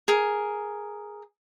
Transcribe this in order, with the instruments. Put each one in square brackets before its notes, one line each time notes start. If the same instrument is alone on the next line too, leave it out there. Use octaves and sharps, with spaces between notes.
[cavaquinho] G#4 A#4